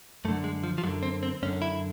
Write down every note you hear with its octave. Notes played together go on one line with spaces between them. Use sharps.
F#2 D3 A3
G#3
F3
F3
F#2 D3 F#3
C4
C4
F#2 D3 C#4
E4